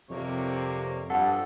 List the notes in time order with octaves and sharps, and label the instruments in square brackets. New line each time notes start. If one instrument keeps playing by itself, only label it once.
[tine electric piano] F2 [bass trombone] C3 [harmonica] G3 A#3 C#5
[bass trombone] G2 [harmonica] F3 [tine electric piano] A4 [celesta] F#5